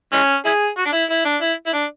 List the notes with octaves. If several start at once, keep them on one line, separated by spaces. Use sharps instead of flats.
E3 G#3 C#4
E4 G#4
F#4
D4
E4
E4
D4
E4
E4
D4